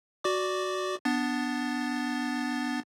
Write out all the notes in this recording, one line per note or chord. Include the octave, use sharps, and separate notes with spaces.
F#4 D5 D6
B3 D4 A6